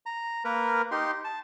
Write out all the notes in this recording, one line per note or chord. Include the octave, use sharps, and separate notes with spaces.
A#5
A#3 A#4 B4
D#4 G4 C6
A5